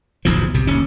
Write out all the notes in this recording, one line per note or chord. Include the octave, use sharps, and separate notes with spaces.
D1 B1 E2 F3
B1 C3
D1 D#2 C#4